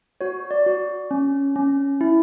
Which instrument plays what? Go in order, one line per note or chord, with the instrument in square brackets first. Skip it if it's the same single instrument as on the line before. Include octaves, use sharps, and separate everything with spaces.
[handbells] F#4 C#5
D5
F#4
C#4
C#4
E4